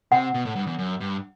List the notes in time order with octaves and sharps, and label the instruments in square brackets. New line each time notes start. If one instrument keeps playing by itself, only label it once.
[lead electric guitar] C3 [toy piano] F#5
[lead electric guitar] B2
A2
G2
E2
F#2
G2